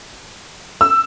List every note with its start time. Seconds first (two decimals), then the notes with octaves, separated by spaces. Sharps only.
0.81 E6